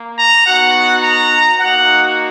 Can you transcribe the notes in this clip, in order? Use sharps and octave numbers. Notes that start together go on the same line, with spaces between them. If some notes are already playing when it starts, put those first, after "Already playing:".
Already playing: A#3
A#5
B3 D#4 F#4 F#5
A#5
A#3 D#4 F#4 F#5